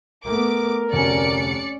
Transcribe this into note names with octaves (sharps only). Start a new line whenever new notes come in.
A3 B3 A#4 D6
F1 D2 C#4 D5 G#5 C#7